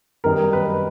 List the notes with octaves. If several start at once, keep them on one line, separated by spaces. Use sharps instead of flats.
F#2 D#3 G3 B3 D#4 A#4
B4